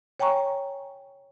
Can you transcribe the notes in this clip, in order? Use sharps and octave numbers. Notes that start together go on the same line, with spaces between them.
C#5 G5 G#5 A#5 C#6